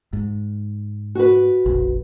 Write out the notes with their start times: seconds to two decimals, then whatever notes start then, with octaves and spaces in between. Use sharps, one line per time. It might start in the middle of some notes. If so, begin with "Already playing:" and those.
0.13 G#2
1.15 F#4 B4
1.66 F1 A#1